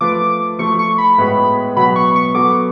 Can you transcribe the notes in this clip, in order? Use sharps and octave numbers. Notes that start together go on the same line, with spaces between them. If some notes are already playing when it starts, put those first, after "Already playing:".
F3 A3 F4 B4 D6
F3 A3 F4 C#6
C#6
B5
A2 G#3 B3 F#4 B4
B2 F#3 B3 B5
C#6
C#6
F#3 B3 F#4 A4 D6